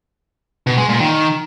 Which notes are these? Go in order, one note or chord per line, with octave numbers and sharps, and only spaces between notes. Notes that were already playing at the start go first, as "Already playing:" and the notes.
B2
G#3
A#2
D#3